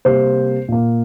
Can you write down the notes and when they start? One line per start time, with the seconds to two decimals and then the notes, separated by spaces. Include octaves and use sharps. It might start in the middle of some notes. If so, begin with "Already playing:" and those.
0.05 C3 G3 A#3 C5
0.68 A#2 A#3